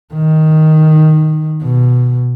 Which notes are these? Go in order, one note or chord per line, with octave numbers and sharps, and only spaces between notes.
D#3
B2